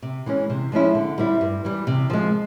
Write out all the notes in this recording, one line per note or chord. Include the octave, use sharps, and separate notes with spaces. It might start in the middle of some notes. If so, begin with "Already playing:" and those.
C3
E3 G#3 C#4
C3
F3 G#3 C#4 E4
D3
G3 C4 E4
G2
E3 G3
C3
F3 G#3